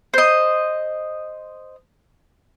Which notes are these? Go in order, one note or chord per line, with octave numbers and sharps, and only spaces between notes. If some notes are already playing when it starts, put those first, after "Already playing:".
C5 D#5